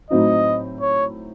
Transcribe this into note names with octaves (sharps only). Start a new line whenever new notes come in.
A2 F#3 C4 D#4 D#5
C#5